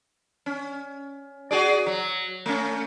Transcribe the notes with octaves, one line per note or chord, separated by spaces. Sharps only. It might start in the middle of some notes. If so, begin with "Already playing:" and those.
C#4
F#4 G#4 D5
F#3
A3 C#4